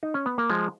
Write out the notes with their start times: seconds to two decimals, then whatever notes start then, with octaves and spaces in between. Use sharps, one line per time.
0.03 D#4
0.14 C#4
0.26 B3
0.38 A#3
0.50 F3 G#3